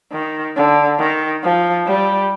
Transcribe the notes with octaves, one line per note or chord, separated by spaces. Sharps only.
D#3
D3
D#3
F3
G3